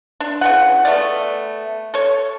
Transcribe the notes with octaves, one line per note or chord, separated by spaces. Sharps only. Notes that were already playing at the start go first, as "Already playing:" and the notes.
D4
C#3 E3 F#5
A3 B3 D5
A4 C#5